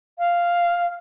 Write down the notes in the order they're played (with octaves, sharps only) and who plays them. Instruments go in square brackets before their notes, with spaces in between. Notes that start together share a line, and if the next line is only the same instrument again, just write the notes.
[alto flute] F5